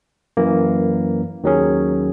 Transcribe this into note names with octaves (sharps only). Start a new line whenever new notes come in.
F#2 E3 A#3
D#2 D#3 F#3 C#4 G#4